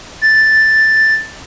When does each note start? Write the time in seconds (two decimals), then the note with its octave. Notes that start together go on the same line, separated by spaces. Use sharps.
0.21 A6